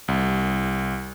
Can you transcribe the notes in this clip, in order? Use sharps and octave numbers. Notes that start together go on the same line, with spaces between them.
C2